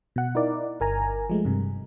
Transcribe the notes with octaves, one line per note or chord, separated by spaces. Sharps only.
B2 F#5
D#4 E4 A#4 D5
G1 A#4 G#5 A#5
F3 G#3 A3
G2 C3